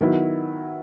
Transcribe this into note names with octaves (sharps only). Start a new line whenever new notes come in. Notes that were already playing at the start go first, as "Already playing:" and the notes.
D#3 F#3 B3 E4